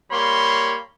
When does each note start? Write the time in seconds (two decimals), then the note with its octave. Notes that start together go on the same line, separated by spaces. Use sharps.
0.12 G3 A#3 C#5 B5 C6